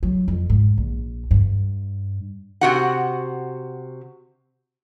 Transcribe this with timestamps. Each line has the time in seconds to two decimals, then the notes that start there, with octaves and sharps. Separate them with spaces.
0.03 F#3
0.28 F2
0.50 G#2
0.78 A#1
1.31 G2
2.61 C3 F#4 F#5